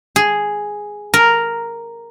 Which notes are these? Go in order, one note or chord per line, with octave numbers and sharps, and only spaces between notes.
G#4
A#4